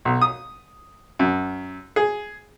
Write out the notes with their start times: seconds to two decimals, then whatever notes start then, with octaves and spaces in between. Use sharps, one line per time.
0.05 B1
0.22 D#6
1.19 F#2
1.96 G#4